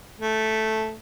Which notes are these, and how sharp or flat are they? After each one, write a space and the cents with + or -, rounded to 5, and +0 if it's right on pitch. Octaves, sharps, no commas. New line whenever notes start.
A3 -5